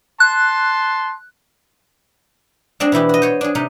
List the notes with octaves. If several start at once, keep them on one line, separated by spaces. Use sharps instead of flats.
A5 C6 F#6
G#3 C4 D4 G#4
B2 E3 E4 G4
F#4 D#5
C5 C#5 D#5
D4 G#4
C3 D#4